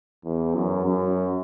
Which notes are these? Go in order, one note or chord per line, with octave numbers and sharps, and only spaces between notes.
E2
F#2
F#2